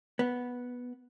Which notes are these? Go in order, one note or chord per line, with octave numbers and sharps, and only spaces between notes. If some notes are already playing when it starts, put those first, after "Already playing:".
B3